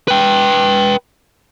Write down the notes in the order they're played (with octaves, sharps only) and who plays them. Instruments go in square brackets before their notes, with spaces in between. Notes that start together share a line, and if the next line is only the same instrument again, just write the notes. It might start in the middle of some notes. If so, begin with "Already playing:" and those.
[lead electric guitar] B4 G5